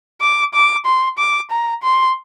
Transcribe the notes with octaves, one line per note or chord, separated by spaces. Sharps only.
D6
D6
C6
D6
A#5
C6